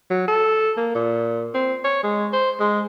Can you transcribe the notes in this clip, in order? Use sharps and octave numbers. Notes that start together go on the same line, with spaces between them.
F#3
A4
A#3
A#2
C4
C#5
G#3
C5
G#3